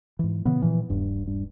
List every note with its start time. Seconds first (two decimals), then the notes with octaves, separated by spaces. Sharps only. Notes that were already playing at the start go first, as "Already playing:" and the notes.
0.19 G#2 E3
0.45 A#2 C#3 E3 B3
0.62 A#2 E3 F3
0.90 D#1 G2
1.27 G2